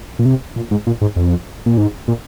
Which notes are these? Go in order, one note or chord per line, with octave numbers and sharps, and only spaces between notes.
A#2
C3
A#2
G#2
A#2
G#2
F2
A#2
G#2
A#2